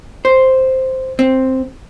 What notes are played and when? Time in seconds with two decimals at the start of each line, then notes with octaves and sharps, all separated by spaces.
0.25 C5
1.19 C4